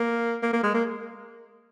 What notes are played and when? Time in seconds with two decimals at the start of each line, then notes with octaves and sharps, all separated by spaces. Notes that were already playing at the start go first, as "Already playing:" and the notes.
Already playing: A#3
0.43 A#3
0.53 A#3
0.63 G#3
0.74 A#3